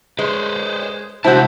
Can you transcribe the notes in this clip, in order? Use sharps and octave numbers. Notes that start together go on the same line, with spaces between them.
G#3 B4 C5
C3 G#3 E4 F#4 C5 A5